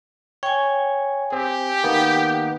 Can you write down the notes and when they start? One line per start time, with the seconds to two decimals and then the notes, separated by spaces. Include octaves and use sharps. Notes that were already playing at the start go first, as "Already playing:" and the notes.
0.43 C#5 G5 G#5
1.32 C4 G4
1.84 D#3 A#3 B3